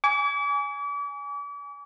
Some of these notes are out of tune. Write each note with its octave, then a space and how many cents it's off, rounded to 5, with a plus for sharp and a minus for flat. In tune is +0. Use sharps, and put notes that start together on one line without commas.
G#5 -5 D6 -40